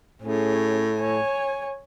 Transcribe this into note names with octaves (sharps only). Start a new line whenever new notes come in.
A2 C#4 G#4
C#5 G#5